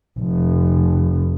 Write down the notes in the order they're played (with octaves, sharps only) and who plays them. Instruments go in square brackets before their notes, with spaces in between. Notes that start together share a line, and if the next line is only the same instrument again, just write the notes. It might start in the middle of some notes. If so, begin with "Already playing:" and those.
[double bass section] F1